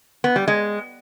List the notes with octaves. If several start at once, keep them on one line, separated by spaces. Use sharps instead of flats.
B3
G3
G#3